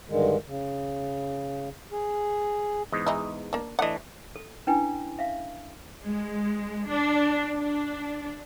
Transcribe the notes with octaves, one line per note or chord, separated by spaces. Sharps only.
G2 D3 D#3 G#3
C#3
G#4
E2 G#2 D#5
G#3 D#4 E4
A#3 D4
E3 A3 D4 D#5 F#5
A4
C#4 D4 E4 B4 G5 G#5
E5 F5
G#3
D4
D4